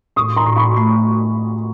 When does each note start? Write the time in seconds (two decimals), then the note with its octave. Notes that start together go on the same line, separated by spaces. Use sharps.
0.16 A2 C#6 D#6
0.37 A#5 C6
0.46 A2
0.56 B5 C#6
0.77 A3